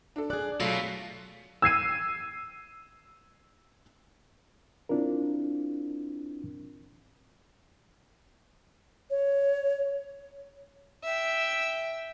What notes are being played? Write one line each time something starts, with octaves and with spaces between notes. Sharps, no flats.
D4 A4
G#4 D5 F#6
B2 F#3 A3 F4
E6 G#6 C7 D#7
C4 D4 E4 F4 A#4
C#5
E5 G5